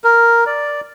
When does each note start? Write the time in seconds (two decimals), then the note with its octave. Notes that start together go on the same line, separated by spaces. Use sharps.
0.04 A#4
0.47 D5